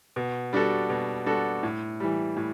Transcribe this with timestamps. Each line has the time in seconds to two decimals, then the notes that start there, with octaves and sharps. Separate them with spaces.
0.16 B2
0.53 G3 D4 F#4 A4
0.90 B2
1.26 G3 D4 F#4 A4
1.63 A2
2.00 E3 G3
2.36 A2